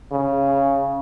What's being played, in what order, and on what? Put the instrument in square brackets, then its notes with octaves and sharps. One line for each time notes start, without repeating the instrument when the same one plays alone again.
[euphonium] C#3